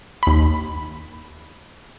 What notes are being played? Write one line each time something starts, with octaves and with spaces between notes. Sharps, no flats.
D#2 B5